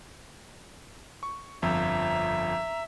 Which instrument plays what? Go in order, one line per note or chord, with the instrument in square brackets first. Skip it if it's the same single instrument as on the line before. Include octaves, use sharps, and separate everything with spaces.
[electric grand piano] C#6
[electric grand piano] G1 F2 F3 [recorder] E5 [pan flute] A#5